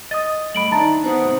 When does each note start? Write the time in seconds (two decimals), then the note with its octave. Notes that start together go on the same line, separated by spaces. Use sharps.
0.11 D#5 D#6 A6
0.55 G2 A3 B5 D7 F#7
0.71 D#3 D4 D#4 E5 A5 A#5 A6
1.04 B3 F#4 C5 F#5 D#6
1.24 G#2 C3